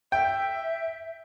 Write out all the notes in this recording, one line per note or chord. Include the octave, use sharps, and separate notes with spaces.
E5 G5